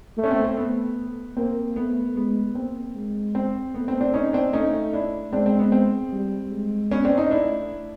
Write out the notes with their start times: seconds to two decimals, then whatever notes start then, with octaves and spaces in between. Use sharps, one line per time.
0.17 A3
0.24 C#4
0.31 C4
0.44 C4
0.57 A3 B3
1.37 A#3 C4
1.76 A3 B3
2.16 G#3 B3
2.55 A#3 C4
2.95 G#3
3.35 C4
3.74 A3 B3
3.88 C4
4.00 C4 D4
4.14 C#4 D#4
4.33 C4 D4
4.53 A3 C#4 D#4
4.93 D4 E4
5.32 G#3 C4 D4
5.46 C4
5.59 B3
5.72 C4
6.12 G3
6.51 G#3
6.91 B3 C#4
7.05 C4 D4
7.17 C#4 D#4
7.30 A3 D4 E4